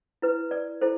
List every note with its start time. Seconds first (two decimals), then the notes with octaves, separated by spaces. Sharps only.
0.22 E4 B4
0.51 D5
0.81 E4 A4 C5